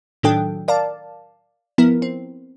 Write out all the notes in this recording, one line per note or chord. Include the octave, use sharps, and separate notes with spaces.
A2 D#3 F#3 D4 A4 G5
A#4 D5 F5 A5
F3 B3 E4 A#4
C4